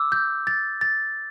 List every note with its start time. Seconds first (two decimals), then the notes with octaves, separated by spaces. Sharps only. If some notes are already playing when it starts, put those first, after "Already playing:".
Already playing: D6 E6
0.12 G6
0.47 A6
0.81 A6